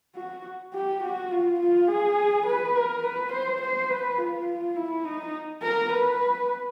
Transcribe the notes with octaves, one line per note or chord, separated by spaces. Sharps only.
F#4
G4
F#4
F4
F4
G#4
B4
A#4
B4
C5
C5
B4
F4
E4
D#4
A#4
B4